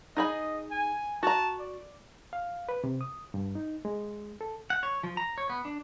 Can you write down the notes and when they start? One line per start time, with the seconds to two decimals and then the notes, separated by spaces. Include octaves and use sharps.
0.17 D#4 G#4 D#5 B5
0.71 G#5
1.23 F#4 A5 A#5
1.60 D5
2.33 F5
2.69 B4
2.84 C3
3.01 D#6
3.34 G2
3.55 D#4
3.85 G#3
4.41 A4
4.70 F#5
4.83 C#5
5.03 F3
5.17 A#5
5.38 C#5
5.50 B3
5.65 D4